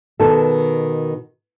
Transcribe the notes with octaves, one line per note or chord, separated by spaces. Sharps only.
B2 D#3 A4